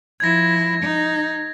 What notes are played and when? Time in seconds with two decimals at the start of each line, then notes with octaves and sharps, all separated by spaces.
0.20 F3 E4 G#6 A#6
0.82 D#4